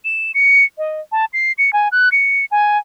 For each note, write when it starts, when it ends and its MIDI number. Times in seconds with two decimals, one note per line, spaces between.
0.05 0.31 100
0.34 0.64 97
0.78 1.00 75
1.12 1.25 81
1.33 1.52 96
1.58 1.73 97
1.73 1.88 80
1.92 2.09 90
2.12 2.45 97
2.51 2.78 80